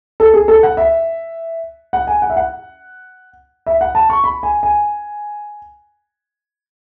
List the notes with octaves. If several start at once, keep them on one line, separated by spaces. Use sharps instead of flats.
A4
G#4
A4
F#5
E5
F#5
G#5
F#5
E5
F#5
E5
F#5
A5
C#6
B5
G#5
G#5